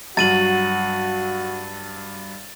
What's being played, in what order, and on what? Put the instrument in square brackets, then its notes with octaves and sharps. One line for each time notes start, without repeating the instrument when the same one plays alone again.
[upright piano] G2 F#3 [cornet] F#4 [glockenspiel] A6 D#7 F#7